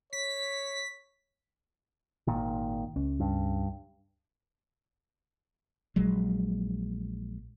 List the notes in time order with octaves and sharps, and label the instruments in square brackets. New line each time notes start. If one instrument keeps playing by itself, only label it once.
[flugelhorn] C#5 [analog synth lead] B6
[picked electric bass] G#1 A#2 D#3
[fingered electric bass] C#2 C#4
[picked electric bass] G2
[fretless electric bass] A#1 F#3 G#3